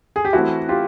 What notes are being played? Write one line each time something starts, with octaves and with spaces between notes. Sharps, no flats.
G#4
G4
E3 A3 C4 E4 F#4
F4 G4